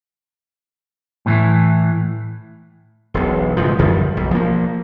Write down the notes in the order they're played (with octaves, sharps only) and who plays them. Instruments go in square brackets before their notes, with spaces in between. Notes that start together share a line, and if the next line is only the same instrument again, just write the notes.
[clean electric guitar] A2 E3
[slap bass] E1 B1
G#2 C#3 E3 F3
G1 F#2 F3 G3
B1
F3 A#3